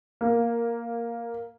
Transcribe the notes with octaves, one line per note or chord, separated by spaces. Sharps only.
A#3